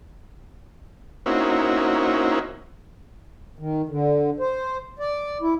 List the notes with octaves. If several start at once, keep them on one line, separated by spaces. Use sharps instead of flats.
A#3 C4 C#4 D#4 E4 F#4
D#3
D3
C5
D5
E4